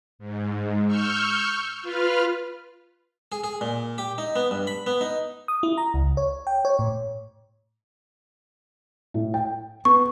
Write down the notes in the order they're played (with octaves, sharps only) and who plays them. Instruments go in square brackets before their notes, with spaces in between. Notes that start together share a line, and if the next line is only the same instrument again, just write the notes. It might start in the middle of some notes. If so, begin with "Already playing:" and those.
[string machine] G#2
C#6 E6 F6 G6
F4 B4 F6
[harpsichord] G#4
G#4
A#2
G4
D#4
B3
G2
B5
B3
D#4
[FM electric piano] D#6
E4
A#5
C#2
C#5
G5
C#5
A2
[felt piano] A2
G5
[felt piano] B3 [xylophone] C#6